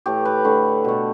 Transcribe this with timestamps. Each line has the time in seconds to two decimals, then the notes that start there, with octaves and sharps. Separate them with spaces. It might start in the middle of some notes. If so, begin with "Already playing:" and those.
0.06 A2 E3 A3 G4
0.25 B4
0.44 D3 A3
0.84 B2 A3